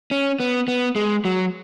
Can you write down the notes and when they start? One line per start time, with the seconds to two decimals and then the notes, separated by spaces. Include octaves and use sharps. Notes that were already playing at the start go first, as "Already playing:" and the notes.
0.11 C#4
0.40 B3
0.68 B3
0.96 G#3
1.25 F#3